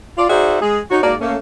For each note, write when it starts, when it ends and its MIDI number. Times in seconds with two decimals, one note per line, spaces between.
0.18 0.26 65
0.18 0.26 74
0.30 0.59 63
0.30 0.59 66
0.30 0.59 68
0.30 0.59 72
0.30 0.59 74
0.30 0.59 76
0.61 0.80 56
0.61 0.80 68
0.91 1.01 63
0.91 1.01 66
0.91 1.01 73
1.03 1.15 44
1.03 1.15 58
1.03 1.15 66
1.03 1.15 74
1.21 1.36 57
1.21 1.36 58
1.21 1.36 61